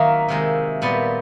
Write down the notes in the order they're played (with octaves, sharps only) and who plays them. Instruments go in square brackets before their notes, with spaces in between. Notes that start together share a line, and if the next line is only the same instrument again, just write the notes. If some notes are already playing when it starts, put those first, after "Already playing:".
Already playing: [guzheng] D#3 F#3 A#3 D#4 F#4 [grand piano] E5 F5
[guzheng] C3 D#3 G#3
A#2 G3 B3